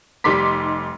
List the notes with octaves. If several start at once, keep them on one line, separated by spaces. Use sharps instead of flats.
F1 G3 D#4 C6 D6 B6